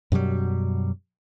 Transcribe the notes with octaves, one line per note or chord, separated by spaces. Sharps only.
F#2 B2 F#3 G3